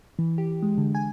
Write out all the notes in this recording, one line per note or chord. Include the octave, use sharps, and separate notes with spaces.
E3
G4
G#3
D3
G#5